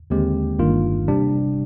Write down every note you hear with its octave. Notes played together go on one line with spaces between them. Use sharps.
D#2 D3 G#3 C4 G4
G1 G2 D#3 A#3 F4
C3 G3 D4